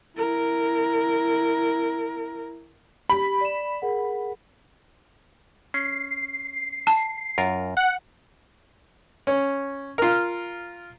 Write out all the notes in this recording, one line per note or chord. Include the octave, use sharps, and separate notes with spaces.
E4 A#4
G4 B5
D5 E7
G#4 A#4 F#5
C#4 C7
A5
F#2 F4 A#4
F#5
C#4
F4 A#4